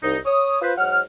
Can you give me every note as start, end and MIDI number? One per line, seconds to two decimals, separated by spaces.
0.03 0.17 36
0.03 0.17 63
0.25 0.59 73
0.25 0.59 87
0.62 0.73 65
0.62 0.73 71
0.62 0.73 72
0.78 1.00 44
0.78 1.00 54
0.78 1.00 78
0.78 1.00 89